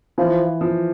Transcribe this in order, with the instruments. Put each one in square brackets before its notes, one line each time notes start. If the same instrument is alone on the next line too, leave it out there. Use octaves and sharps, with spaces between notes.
[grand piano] E3 [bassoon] F3
[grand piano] F3